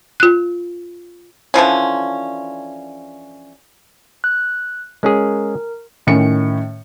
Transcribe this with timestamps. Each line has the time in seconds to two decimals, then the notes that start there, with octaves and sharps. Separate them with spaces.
0.20 F4 F#6
1.54 D3 E3 F3 C#4
4.24 F#6
5.03 G#3 C#4 G#4 A#4
6.07 A2 D#3 C#4 C#7